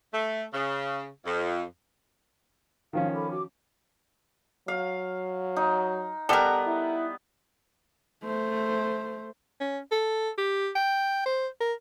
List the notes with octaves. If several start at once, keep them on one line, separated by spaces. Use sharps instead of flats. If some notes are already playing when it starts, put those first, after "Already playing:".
A3
C#3
F2
D#3 F3 C#4 F5
A4 B5 D6
F#4 D6
F#3 F5
D#4
G3 B3 A4 A#4 F#5
E4
A3 C5
C#4
A4
G4
G5
C5
A#4